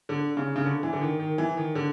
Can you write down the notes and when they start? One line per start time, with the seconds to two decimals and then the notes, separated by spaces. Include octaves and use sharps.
0.09 D3
0.37 C#3
0.56 C#3
0.65 D3
0.83 E3
0.93 D3
1.01 D#3
1.20 D#3
1.38 E3
1.57 D#3
1.75 D3